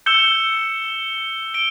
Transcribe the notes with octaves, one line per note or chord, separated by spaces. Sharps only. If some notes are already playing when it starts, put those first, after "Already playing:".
E6 G6 C#7 E7 G7
D7 G7